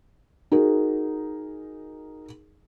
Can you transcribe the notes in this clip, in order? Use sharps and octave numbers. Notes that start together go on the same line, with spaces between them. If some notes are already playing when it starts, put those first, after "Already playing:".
D#4 F#4 G#4 A#4